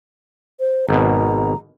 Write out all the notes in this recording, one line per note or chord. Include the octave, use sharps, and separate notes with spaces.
C5
G#1 B2 A#5